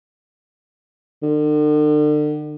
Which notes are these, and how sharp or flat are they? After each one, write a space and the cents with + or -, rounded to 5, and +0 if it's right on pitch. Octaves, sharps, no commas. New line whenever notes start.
D3 +40